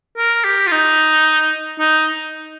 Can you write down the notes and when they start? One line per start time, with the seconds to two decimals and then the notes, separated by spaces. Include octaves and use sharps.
0.17 A#4
0.44 G4
0.67 F4
0.71 D#4
1.79 D#4